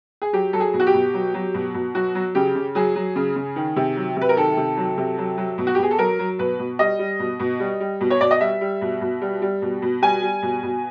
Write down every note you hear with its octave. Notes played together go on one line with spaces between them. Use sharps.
G#4
F#3 G4
F#3 A4
G#4
B2
F#4
G4
B2
F#3
F#3
B2
B2
F#3 F#4
F#3
C#3 G4
C#3
F#3 G#4
F#3
C#3
C#3
D#3
C3
F#3
C3 B4
A#4
D#3 A4
C3
F#3
C3
F#3
F#3
B2
F#4
G4
B2 G#4
A4
F#3 A#4
F#3
B2 B4
B2
G3 D#5
G3
B2
B2
G3
G3
B2
C#5
B2 D5
D#5
G3 E5
G3
B2
B2
G3
G3
B2
B2
G3 G#5
G3
B2
B2